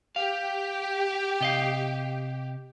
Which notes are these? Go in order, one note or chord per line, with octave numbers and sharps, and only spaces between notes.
G4 F5
C3 D#5 F5